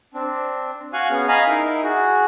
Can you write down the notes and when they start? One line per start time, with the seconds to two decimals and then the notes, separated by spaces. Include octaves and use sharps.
0.14 C4 D4
0.93 F#4 F5 G#5 C#6 F#6
1.10 B3 C#4 G#4
1.28 D#5 F5 G#5 A#5 B5
1.48 D#4 E4 A#4
1.83 F#4 G#4